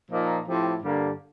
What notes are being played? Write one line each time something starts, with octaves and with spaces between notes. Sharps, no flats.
A#2 F3 A#3 D#4
A2 F3 C4 G4
G2 D3 G3 A#3